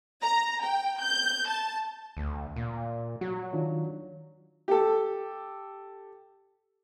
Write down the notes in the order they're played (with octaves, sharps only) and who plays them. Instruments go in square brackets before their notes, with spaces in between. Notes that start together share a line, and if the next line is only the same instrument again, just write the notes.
[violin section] A#5
G5
G6
A5
[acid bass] D2
A#2
[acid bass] F#3 [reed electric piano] F#4
[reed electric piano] D#3 D4 F4
[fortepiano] G4 A4